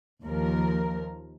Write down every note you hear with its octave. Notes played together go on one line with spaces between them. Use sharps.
D#2 F3 A#4